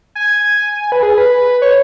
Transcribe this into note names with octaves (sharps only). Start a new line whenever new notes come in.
G#5
B4
G#4
B4
C#5